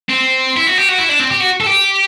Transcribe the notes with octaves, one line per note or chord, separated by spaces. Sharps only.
C4
E4
F#4
G4
F#4
E4
D4
C4
G4
F#4
A4
G4